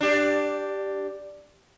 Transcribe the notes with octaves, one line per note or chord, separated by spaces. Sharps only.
D4 G4